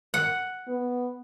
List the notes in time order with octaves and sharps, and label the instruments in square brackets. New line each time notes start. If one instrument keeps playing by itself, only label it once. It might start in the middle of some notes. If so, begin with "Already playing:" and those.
[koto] F#5
[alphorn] B3